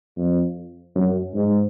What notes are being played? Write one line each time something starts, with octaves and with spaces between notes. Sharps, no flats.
F2
F#2
G#2